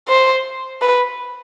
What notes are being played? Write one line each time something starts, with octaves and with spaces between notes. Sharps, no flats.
C5
B4